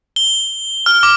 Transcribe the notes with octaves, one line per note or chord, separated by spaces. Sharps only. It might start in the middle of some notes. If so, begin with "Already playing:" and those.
G7
F6
D6